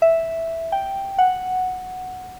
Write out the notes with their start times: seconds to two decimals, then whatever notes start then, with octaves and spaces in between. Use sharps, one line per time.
0.02 E5
0.72 G5
1.19 F#5